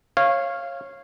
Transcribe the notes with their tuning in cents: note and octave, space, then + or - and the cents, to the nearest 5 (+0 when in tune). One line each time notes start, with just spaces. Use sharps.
C#5 -20 F5 -10